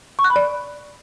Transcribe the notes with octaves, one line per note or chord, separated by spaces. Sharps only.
C#6
F#6
B5
D5